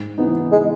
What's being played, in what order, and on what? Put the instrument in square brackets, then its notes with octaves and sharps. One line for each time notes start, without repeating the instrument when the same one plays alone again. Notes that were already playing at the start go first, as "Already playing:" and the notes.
Already playing: [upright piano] G#2
E3 B3 D#4
[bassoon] G#3